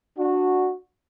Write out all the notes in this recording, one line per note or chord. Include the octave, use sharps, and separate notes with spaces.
D4 F#4